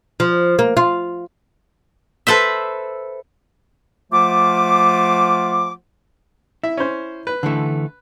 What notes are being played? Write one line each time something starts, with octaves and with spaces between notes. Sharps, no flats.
F3
A#3
F4
A4 B4 C5 E5
F3 A3 F4 F#5 D6
E4 E5
C#4 C5
B4
D3 E3 A3